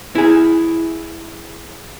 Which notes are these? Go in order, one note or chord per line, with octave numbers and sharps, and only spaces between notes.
E4 G#4